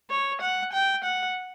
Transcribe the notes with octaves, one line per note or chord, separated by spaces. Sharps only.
C#5
F#5
G5
F#5